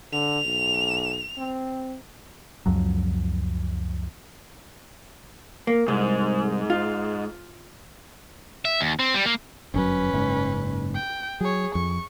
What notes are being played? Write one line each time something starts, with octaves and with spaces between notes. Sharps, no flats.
D3 F7
B1
C4
C#2 F#2 F3 F#3
A#3
C2 G#2
F4
E5
D#2
C4
G3
A#3
G1 F#2 F#3 C#4 B4
F#1 G#2
G5
F#3 G#4 C#5
F2 C#6